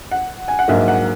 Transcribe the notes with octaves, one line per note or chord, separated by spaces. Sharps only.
F#5
G#5
F#5
A#1 G#2 F#3 A#3 E5
F#5